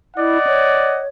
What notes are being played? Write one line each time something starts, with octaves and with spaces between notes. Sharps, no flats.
E4 D5 D#5 F#5
C#5